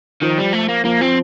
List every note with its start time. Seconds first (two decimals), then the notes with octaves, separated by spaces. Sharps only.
0.22 D#3 F3
0.38 G3
0.53 A3
0.68 A#3
0.85 F3 A#3
1.01 F3 C4